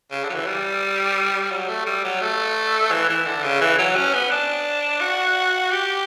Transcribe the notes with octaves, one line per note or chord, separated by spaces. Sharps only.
C#3
D3
F#3
E3
G3
F#3
A3
G3
F#3
A3
E3
E3
D3
C#3
E3
F#3
C#4
B3
D4
F#4
G4